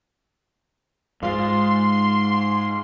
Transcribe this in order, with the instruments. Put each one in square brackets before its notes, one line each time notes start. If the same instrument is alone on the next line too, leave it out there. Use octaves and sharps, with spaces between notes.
[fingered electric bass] G#2 [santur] F4 F5 [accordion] C6